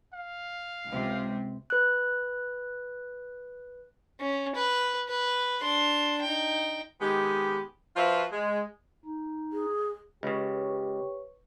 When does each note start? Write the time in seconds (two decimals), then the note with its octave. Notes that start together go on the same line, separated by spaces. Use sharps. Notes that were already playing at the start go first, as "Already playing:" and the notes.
0.14 F5
0.86 C#2 C3
1.70 B4 F#6
4.20 C#4
4.55 B4
5.09 B4
5.62 D4 C6
6.23 D#4 G5
7.01 D#3 G#3 B3 G4
7.96 F3 F4 F#4 B4 C5 E5
8.32 G#3
9.05 D#4
9.52 G#4
10.23 C#2 C#3 G4 B4 C#5 C#6